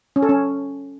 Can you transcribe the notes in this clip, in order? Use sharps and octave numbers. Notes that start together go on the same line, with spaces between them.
C#4
A4
C#4